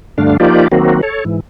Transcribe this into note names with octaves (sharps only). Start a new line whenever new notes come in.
G2 D3 A3 D4 F5
F3 A#3 D#4 F4 G4 D5
D#3 F#3 A#3 C4 F#4
A4 C#5
G#2 E3